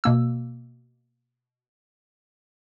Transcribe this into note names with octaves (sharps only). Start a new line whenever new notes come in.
B2 A#3 E6